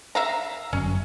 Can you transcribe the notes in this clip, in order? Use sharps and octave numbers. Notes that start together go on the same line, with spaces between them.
E5 F5 A#5
G1 F#2 C#4